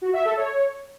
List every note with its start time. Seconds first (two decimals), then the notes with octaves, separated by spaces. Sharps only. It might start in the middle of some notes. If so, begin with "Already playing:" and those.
0.02 F#4
0.13 E5
0.25 A4
0.37 C#5